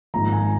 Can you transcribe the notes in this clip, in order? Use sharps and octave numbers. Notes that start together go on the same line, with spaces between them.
G#1 G#2 F3 A#5
G#5